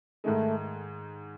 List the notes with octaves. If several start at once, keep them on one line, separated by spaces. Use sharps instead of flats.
G#2 D#3 G#3 A3